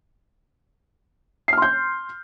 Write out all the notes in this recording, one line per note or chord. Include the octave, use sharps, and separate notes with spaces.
C6 F6 G6 C7